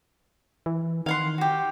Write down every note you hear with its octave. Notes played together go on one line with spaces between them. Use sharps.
E3
D#3 F5 F#5 C6
F#4 G4